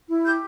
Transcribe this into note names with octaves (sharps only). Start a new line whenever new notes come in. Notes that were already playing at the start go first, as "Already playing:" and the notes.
E4
G4 G6